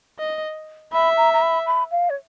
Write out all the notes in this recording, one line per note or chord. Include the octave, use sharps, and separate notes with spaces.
D#5
E5 B5
A#5
A#5
B5
B5
F5
C#5